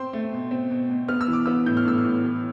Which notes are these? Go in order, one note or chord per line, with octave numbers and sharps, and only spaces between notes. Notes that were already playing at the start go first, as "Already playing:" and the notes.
Already playing: C4 C6
A3
B2
C4
B2
B2
B3 F6
E6
E3
D6
B3 E6
A2 G6
F6
A2 E6
F6
A2
E3